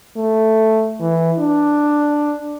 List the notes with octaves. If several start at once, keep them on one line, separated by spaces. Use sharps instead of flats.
A3
E3
D4